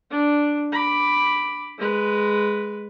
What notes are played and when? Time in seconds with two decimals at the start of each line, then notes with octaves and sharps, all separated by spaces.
0.11 D4
0.72 B5 D6
1.79 G#3 B4